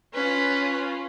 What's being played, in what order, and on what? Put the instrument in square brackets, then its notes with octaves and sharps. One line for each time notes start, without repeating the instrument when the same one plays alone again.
[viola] C#4 F4 [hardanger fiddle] B4